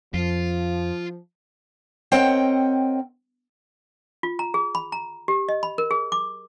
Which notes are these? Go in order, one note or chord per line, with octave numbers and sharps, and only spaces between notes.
F2 F3 F4
C4 A#4 C#5 D#5 F#5 G5
F4
A#5
G#4
B5
A#5
G4
D#5
B5
A#4
G#4
D6